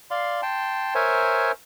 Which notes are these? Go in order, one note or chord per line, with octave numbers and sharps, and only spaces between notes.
D5 F5 C6
G5 A5 C6
A#4 C5 C#5 E5 G#5